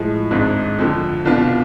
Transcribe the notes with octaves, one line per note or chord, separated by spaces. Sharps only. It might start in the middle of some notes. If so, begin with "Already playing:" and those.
Already playing: A2 F3 G#3
G#1 G#2 G#3 D4
F2 D3 F3
C2 B2 B3 D4 F4